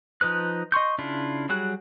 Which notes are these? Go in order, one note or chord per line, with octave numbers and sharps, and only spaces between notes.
F3 D#4 B4 F#6
D#5 C6 C#6 G6
C#3 D4 E4 F4
F#3 G3 F#4 G#4 F#6